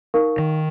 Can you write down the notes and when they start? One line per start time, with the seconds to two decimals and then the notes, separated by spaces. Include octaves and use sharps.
0.14 D#4 A#4 F5 C#6
0.38 D#3